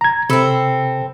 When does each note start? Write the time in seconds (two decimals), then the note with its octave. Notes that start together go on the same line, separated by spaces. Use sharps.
0.01 A#5 G#6
0.30 C3 C4 A4 B5 E6